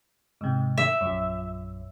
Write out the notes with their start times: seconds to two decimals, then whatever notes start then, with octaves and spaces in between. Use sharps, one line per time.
0.41 G#2 C3
0.78 E5
1.01 A#1 F#2